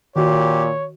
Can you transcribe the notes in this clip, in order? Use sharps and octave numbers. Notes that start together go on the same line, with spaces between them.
A#2 D#3 F#4 G4 C#5